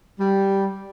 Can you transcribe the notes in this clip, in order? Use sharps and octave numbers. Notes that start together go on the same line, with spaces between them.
G3